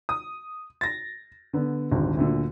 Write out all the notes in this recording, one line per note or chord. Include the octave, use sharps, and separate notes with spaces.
D#6
A6 A#6
D3 B3
D#1 G#1 G#2 D3
D2 A#2 D3